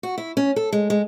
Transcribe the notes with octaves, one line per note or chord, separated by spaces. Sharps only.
F#4
E4
C#4
A4
G#3
G#3